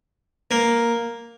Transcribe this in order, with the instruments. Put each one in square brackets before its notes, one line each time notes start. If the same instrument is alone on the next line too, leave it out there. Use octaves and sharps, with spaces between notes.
[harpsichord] A#3